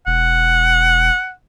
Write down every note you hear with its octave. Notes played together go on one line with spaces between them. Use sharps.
E1 F#5